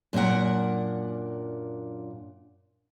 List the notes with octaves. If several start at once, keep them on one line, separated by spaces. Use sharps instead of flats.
F#2 A#2 D4 A#4 F#5